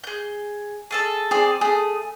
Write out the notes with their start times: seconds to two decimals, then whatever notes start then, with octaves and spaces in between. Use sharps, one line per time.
0.04 G#4 G6
0.91 G#4 A4 E6
1.31 C4 G#4 D5
1.61 A3 G#4